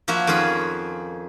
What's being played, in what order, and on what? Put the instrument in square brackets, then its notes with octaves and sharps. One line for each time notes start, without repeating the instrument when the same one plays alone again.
[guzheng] F3 A#3 F#4 C#5 E5
F2 D#3 C#4 F4 G#4 B5